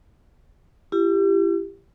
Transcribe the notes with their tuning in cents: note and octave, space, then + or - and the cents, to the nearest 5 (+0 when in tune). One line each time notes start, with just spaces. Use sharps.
E4 +40 G4 +10